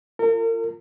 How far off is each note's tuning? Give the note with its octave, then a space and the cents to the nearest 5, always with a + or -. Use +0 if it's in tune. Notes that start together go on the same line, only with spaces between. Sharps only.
F4 -15 A#4 -40